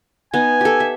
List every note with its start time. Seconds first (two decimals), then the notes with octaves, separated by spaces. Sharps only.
0.34 B3 D#4 G#5
0.61 G4 A4
0.80 E5